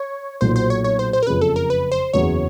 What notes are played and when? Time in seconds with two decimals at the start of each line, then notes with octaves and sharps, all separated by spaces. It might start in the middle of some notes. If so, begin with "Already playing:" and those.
Already playing: C#5
0.41 B1 A#2 F#3 C5
0.56 C5
0.70 C#5
0.84 C#5
0.99 C5
1.13 C5
1.23 A#4
1.27 F#1 F2 C#3 B4
1.41 A4
1.56 A#4
1.70 B4
1.92 C5
2.13 F#1 E2 C#3 F#3 C#5